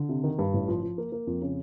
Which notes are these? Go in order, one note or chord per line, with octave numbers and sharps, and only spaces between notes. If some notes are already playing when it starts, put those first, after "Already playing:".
Already playing: D3
C3
D#3
G2
A1
F3
F3
A#3
A#3
F2
C#3